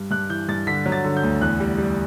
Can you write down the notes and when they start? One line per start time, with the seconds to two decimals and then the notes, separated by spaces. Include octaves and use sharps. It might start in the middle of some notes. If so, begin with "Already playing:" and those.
Already playing: G2 G3
0.11 G2 F#6
0.30 E3 G6
0.48 G2 A6
0.67 D3 B6
0.86 F#3
0.92 A6
1.04 D3
1.17 G6
1.23 D2
1.41 E2 F#6
1.60 G3
1.78 G3